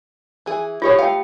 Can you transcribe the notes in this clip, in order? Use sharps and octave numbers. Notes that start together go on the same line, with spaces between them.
E3 G#4
E4 F4 G4 A4 C5 C#5
A3 F5 G5 A5